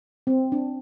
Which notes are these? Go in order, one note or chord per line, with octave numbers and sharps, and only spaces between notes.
C4
D4